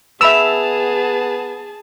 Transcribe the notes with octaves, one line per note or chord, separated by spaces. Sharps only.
B3 G#4 E5 A5 B5 E6 E7 F7